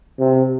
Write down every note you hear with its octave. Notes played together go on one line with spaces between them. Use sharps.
C3